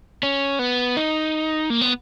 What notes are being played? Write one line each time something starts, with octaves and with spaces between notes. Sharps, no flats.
C#4
B3
D#4
A#3
B3